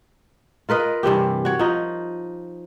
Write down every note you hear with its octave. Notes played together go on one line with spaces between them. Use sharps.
F4 A#4 B4 D#5
G2 C3 E3 G4
F#4 C#5
F3 D#4